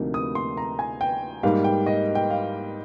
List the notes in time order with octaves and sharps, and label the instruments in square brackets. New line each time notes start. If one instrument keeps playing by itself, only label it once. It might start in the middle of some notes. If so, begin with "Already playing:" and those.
Already playing: [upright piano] D2 C3 F3 A#3 D#4
D#6
C6
A#5
G#5
G5
G#2 G3 A#3 F5
G5
D#5
G5
F5